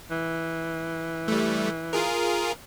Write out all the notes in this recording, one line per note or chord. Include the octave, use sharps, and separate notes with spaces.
E3
G3 A3
F4 G#4 A#4